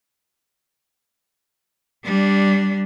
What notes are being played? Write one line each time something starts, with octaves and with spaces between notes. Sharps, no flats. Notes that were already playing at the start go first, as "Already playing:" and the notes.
G3 D4